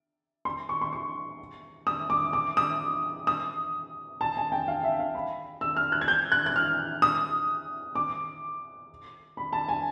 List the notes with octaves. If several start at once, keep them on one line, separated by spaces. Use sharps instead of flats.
C6
C#6
C6
C#6
D#6
D6
D6
D#6
D#6
A5
G#5
G5
F5
E5
F5
B5
E6
F6
F#6
G#6
G6
F#6
F#6
F6
D#6
D6
B5
A5
G#5